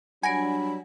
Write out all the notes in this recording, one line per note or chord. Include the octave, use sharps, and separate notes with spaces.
F#3 G3 D4 F#5 G#5 B5 A#6 D7